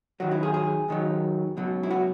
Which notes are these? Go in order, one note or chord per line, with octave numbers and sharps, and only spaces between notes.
D#2 D#3 F#3 F#4
E4
G#4
G#4
D#2 D#3 F#3
C#2 B2 F#3
E4
F#4